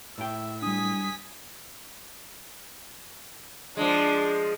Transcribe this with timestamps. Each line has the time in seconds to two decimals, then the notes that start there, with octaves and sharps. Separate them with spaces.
0.18 A2 E5 G5
0.62 G3 D4 G#5 D#6 B6
3.77 F3 G#3 D4